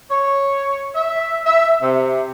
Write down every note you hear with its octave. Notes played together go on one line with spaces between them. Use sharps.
C#5
E5
E5
C3